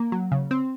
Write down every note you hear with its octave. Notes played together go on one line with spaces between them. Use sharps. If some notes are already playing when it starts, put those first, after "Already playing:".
Already playing: A#3
F#3
C#3
C4